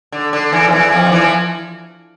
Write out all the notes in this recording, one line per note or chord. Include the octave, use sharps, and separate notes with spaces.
D3
D3
E2 E3
F3
E2 E3
F2 F3
D3
E2 E3
F3